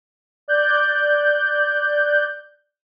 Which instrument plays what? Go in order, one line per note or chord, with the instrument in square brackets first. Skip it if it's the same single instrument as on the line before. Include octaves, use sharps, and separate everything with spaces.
[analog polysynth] D5 F#6 G6